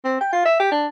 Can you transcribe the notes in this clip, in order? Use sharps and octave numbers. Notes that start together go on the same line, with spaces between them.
C4
G5
F4
E5
G4
D4